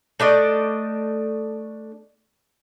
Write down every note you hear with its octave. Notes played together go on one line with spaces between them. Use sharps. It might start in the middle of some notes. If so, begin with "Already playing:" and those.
A3 D4 D5 D#5